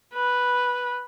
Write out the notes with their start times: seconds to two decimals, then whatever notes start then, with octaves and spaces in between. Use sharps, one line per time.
0.14 B4